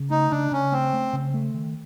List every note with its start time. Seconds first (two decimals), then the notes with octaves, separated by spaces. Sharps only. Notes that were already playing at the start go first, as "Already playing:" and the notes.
Already playing: C#3
0.10 A3 D#4
0.31 C#3 D4
0.51 C#3 C#4
0.72 A3 C4
0.93 A3
1.13 C#3
1.34 A3
1.54 D#3